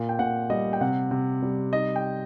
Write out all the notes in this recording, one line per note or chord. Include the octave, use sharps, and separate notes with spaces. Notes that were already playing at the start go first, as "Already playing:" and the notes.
Already playing: A#2
G5
A#2 F#5
G3 D#5
G5
C3 F#5
C3
G3
D#4 D#5
G5